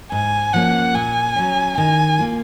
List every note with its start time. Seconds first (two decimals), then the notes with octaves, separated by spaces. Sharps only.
0.12 G#2 G#5
0.54 F3 A#3 C#4 F#5
0.95 A#2 G#5
1.36 F#3 C#4
1.78 D#3 G#5
2.19 A#3 F4